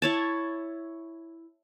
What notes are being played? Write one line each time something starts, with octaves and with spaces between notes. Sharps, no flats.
E4 C#5 A5